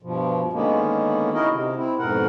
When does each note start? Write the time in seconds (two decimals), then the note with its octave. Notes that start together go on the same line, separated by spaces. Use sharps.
0.02 G2 B2 F3
0.53 D3 D#3 G#3 A#3 B3 C#4
1.34 D#4 E4 F#4 G#4 A#4 D#5
1.51 C3
1.76 C4 E4
1.99 F2 G#2 B2 A#4 F#5